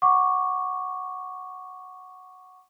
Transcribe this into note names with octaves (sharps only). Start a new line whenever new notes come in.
F#5 C#6 D6